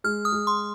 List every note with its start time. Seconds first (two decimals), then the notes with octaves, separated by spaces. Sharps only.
0.04 G#3 F6
0.25 D#6
0.32 G#3
0.47 C6